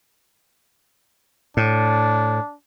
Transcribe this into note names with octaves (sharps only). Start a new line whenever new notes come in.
A2 D4